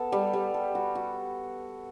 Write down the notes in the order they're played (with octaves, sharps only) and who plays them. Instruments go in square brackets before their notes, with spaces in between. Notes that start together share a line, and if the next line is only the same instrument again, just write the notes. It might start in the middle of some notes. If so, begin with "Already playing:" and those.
Already playing: [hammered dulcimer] B3 A4
G3
G3
A4
F#4
F#4